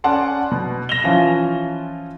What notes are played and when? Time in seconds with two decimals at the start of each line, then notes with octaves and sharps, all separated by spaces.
0.04 C#4 D5 F#5 A5 C6
0.51 B2
0.89 A#6 E7 F7 G7
1.04 E3 F3 C#4 F4